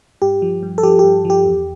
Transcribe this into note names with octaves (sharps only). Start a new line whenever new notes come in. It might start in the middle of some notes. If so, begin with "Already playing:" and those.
G2 G4
F3
G2
A4
F3 G4
G2 G4
F3
G4
E2